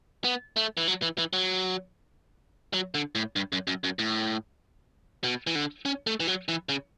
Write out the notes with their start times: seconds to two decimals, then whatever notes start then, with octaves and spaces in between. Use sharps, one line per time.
0.24 B3
0.56 A3
0.77 E3
0.87 F#3
1.02 E3
1.18 E3
1.33 F#3
2.74 F#3
2.94 D3
3.15 A2
3.36 G2
3.52 F#2
3.67 F#2
3.84 F#2
3.99 A2
5.24 B2
5.47 E3
5.55 D3
5.85 C#4
6.07 A3
6.20 E3
6.27 F#3
6.48 E3
6.69 C#3